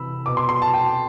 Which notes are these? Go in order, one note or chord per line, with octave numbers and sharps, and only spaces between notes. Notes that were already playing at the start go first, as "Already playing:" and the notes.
Already playing: C3 E3 B5 E6
B2 D6
C6
C6
A5
G5